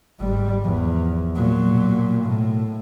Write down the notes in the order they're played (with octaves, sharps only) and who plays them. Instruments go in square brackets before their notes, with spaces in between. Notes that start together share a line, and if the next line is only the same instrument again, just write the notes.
[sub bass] G1 [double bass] G#2 G3
[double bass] E2 [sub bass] F3
[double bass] A#2 F#3
[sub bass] B2
[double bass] A2